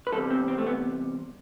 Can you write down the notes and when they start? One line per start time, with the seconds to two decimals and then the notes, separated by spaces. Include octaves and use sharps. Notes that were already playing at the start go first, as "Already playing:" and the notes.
0.07 B4
0.12 E2 C3 G3 A4
0.31 C4
0.48 C4
0.58 A3
0.67 B3